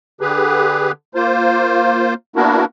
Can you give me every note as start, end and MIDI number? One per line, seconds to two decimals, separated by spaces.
0.21 0.92 50
0.21 0.92 67
0.21 0.92 68
0.21 0.92 71
1.15 2.14 58
1.15 2.14 65
1.15 2.14 72
2.36 2.65 58
2.36 2.65 59
2.36 2.65 62
2.36 2.65 64
2.36 2.65 66
2.36 2.65 70